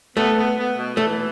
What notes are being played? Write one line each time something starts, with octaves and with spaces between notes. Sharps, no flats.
A3 B3
B3
B3
B2
E3 A3